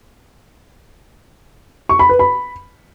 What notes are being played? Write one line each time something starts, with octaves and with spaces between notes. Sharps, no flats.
C#6
B5
B4
B5